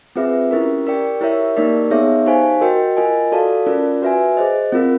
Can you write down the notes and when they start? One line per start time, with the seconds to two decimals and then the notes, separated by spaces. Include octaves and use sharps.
0.16 C4 F4 G#4 B4 E5
0.51 C#4 E4 G4 A#4
0.86 G4 A#4 D5 G5
1.21 E4 G4 A#4 C#5 E5
1.57 A#3 D#4 G4 A#4 D5
1.91 B3 D#4 G#4 C#5 E5
2.26 D#4 G4 C5 F5 G#5
2.61 F#4 A#4 D#5 G5
2.97 F4 A#4 D#5 G#5
3.32 F#4 A4 D5 F5 A5
3.66 C#4 F4 A#4 D5
4.02 F#4 B4 E5 G#5
4.37 G#4 C5 D#5
4.72 C4 F4 A#4